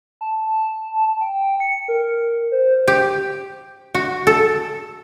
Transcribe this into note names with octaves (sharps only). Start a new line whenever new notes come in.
A5
G5
C#7
A#4
C5
G4
F#4
A4